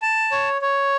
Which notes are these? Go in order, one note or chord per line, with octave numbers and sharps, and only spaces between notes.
A5
C#5
C#5